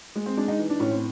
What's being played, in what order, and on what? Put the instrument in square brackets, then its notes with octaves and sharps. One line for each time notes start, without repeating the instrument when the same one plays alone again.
[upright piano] G#3
C4
G#3 D4
D#4
E3
D4
A2 C#4
C4